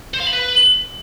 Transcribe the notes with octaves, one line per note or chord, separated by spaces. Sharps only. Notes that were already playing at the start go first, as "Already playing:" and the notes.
C5
F5
B5
B4